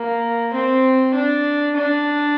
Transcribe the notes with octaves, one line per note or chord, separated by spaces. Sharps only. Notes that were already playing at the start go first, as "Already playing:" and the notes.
Already playing: A#3
C4
D4
D4